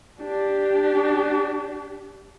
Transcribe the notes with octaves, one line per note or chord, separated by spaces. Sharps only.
D4 G4